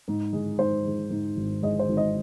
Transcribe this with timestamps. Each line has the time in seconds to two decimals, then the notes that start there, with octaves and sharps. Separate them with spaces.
0.08 G#2
0.33 G#3
0.59 G#2 C5
0.85 G#3
1.11 G#2
1.37 G#1
1.62 G#3 D#5
1.79 C5
1.89 G#1
1.97 D#5